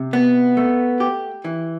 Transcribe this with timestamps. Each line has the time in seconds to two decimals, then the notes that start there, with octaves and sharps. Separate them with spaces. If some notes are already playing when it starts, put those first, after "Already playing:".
Already playing: C3
0.13 B3
0.57 A3
1.00 G4
1.44 E3